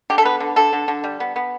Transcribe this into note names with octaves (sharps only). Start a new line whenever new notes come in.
D3 G4
A4
B3 B4
D3
D3 A4
D3
D3
G3
B3
B3